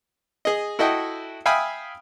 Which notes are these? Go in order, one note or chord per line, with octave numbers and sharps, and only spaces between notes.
G#4 D#5
E4 F#4 A4 D#5 E5 G5
E5 F5 G5 G#5 B5 D#6